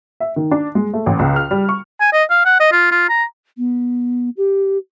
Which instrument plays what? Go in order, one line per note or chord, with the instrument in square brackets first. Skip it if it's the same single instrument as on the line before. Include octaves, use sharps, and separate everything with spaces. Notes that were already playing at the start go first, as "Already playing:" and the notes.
[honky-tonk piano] E5
D#3
D4
G#3
A3
A1
C#2
F6
G3
C#6
[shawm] G#5
D#5
F5
F#5
D#5
F4
F4
A#5
[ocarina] B3
G4